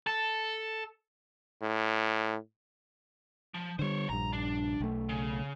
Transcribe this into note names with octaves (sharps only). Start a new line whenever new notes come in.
A4
A2
F3
D3 G3 C5 C#5
A#1 G2 A#5
D4
B1 A3
C#3